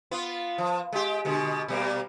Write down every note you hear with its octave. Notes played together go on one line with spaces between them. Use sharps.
B3 F4
F3
G#3 G4
B2 D3 G#3
B2 G3 A#3